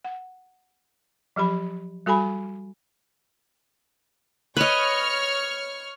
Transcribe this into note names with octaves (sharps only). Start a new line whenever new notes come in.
F#5
F3 F#3 G4 B5
G3 F#4 A4 G#5 B5
B4 C#5 D#5 C#6 F6